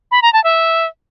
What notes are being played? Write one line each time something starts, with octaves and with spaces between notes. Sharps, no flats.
B5
A#5
A5
E5